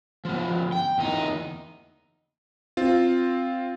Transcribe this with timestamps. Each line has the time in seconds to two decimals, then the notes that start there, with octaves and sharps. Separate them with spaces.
0.25 F3 B3
0.72 G5
0.98 E2 D#4
2.77 C4 F4